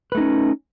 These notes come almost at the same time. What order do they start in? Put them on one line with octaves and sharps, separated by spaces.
B4 A3 D#4 C#4